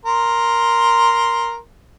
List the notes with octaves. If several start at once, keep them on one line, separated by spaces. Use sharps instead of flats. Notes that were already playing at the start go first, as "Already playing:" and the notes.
A#4 C6